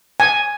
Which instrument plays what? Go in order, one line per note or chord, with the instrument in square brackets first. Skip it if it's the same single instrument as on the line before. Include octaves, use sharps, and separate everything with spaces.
[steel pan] G#5